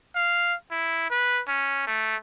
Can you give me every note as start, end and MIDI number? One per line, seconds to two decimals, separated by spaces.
0.15 0.54 77
0.71 1.10 64
1.10 1.41 71
1.48 1.85 61
1.87 2.15 57